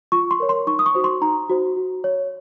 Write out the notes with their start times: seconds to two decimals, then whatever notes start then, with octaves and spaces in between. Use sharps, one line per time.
0.12 F4 C#6
0.31 C6
0.40 A#4 C#5
0.49 C6
0.67 D#4 C#6
0.79 D#6
0.86 C#6
0.95 F#4 C5
1.04 C6
1.22 D#4 A#5
1.50 F#4 C5
1.77 F#4
2.04 C#5